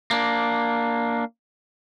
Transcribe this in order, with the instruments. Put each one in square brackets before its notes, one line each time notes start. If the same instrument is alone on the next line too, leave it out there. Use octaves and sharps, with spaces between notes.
[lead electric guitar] A#3 D4